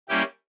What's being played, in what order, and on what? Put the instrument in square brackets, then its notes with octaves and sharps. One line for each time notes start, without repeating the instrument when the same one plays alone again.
[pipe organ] G3 A#3 C#4 E4 G4